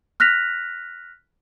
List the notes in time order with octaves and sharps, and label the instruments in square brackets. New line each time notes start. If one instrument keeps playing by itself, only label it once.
[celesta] F6 F#6 A#6 B6 F7